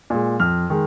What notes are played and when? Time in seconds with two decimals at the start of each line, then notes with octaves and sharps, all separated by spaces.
0.10 A#2 G#3
0.40 F2 F6
0.70 D#3 G#3